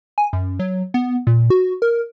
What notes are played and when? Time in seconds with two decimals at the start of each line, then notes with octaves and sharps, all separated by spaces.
0.18 G#5
0.33 F#2
0.60 F#3
0.94 B3
1.27 A#2
1.50 F#4
1.82 A#4